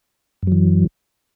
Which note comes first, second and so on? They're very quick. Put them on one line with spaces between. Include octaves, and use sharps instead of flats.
F#2 F#3 E3